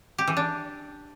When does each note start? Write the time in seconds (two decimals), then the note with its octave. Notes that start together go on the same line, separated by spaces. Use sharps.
0.18 G4
0.28 E3
0.37 D4